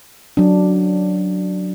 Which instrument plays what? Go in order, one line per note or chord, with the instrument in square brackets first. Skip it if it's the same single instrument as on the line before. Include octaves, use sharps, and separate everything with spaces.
[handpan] F#3 D4